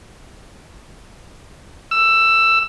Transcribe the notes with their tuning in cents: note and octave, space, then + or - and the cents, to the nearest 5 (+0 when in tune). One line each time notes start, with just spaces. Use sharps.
E6 +15